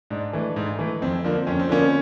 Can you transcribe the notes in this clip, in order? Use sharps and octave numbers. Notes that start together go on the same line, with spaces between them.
G#2 D4
E3 A3
G#2
E3 A3
F2 C4
D3 F3 A#3
F2 C#4
C4
D3 F3 A#3 C#4